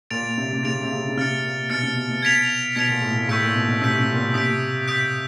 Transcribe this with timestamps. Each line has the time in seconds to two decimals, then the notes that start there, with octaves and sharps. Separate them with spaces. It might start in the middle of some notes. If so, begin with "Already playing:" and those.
0.10 A#2 A6 D7 F7
0.38 C3
0.53 C3
0.63 C#3 A6 D7 F7
0.83 C3
0.91 C#3
1.09 C#3
1.17 C3 F6 A6 C#7
1.43 A#2
1.70 B2 F6 A6 C#7
1.83 C3
1.96 B2
2.10 B2
2.23 G#6 B6 D7 F7
2.75 B2 G#6 B6 D7 F7
2.89 A#2
3.02 A2
3.16 A#2
3.29 A2 C#6 E6 G6 B6 D7
3.42 A#2
3.56 B2
3.68 B2
3.81 C3 C#6 E6 G6 B6 D7
4.00 C3
4.12 A#2
4.17 B2
4.34 C3 D#6 G6 B6 D7
4.88 D#6 G6 B6 D7